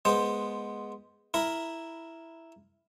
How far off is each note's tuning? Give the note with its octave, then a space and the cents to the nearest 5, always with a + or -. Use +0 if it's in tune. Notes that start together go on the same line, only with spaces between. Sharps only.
G#3 +0 B3 -10 C5 +0
E4 +0 A#4 +0 B5 +0